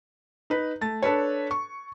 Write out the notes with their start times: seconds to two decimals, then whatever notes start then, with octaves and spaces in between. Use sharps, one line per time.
0.50 D#4 B4
0.81 A3 A6
1.03 D4 A4 B4 C#5
1.51 C#6